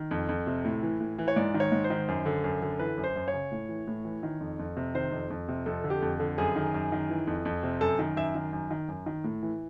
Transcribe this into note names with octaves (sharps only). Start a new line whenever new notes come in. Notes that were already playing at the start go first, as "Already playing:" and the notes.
Already playing: D#3
F2
F2
C3
A2
E3
A2
E3
C#5
G#2 D5
D#3
C#5
G#2
C5
D#3
F#2
D3
F#2
D3
E3 B4
F#2
C5
F#2
C#5
C#3
A2
E3
A2
E3
D#3
F2
F2
C3
D#3 C5
F2
F2
C3
F2 A4
D3
G4
F2
D3
F#2 G#4
D#3
F#2
D#3
E3
F2
F2
C3
F#2 A4
D#3
F#2 E5
D#3
F#2
D#3
F#2
D#3
A2
E3